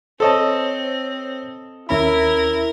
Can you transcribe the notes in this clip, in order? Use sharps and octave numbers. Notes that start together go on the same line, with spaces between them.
C4 A4 C5 C#5 D#5 A5
D#2 C#4 E4 A#4 B5